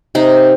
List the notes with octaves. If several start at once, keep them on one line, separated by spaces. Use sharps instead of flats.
C3 D#4